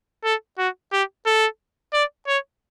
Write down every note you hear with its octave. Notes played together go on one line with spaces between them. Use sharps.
A4
F#4
G4
A4
D5
C#5